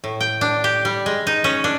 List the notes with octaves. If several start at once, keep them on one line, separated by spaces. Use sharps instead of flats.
A2
G5
D4
G4
G3
G#3
D#4
C#4
D4